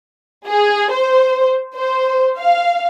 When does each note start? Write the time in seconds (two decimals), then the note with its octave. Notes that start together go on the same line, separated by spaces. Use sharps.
0.48 G#4
0.92 C5
1.76 C5
2.39 F5